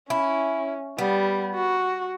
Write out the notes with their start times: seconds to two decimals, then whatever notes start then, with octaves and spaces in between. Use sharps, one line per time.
0.10 C#4 E4
0.98 G3 B3
1.55 F#4